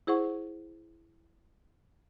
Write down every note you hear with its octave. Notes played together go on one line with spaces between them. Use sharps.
E4 G#4 C5 F#5 C#6